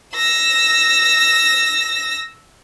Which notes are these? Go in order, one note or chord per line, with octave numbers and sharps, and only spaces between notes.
E6 A#6